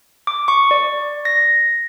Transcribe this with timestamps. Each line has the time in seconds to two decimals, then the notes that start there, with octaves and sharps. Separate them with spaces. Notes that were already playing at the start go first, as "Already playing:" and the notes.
0.27 D6
0.48 C#6
0.71 D5
1.25 A#6